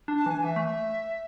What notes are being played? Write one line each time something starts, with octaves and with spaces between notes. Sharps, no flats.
D4
A5
E3 G#5
E3 E5
A3